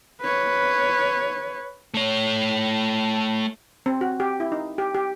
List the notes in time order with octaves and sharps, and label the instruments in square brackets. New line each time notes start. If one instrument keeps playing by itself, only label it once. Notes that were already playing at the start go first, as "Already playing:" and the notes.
[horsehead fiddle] B4 C#5
[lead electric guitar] A3 C#5
[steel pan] C4
F#4
G4
E4
D#4
G4
G4